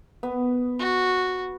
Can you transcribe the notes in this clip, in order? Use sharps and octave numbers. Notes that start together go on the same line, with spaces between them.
B3
F#4